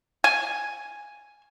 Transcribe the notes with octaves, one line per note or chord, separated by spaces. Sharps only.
G#5